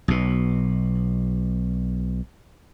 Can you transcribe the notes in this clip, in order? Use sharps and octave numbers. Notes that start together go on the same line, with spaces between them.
B1 B2